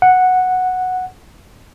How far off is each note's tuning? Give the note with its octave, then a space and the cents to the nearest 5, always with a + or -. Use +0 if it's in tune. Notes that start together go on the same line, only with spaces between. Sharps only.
F#5 -5